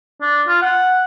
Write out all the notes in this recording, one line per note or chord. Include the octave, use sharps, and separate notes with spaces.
D4
F4
F#5